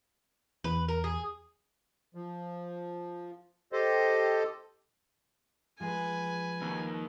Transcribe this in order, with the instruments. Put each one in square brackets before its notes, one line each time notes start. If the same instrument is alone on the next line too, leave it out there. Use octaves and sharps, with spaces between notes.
[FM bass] E2 [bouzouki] B4
[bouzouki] A#4
G#4
[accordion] F3
G4 A4 C5 D#5
[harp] F3 G#3 G#4 [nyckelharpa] B4 G#5
[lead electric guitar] D#2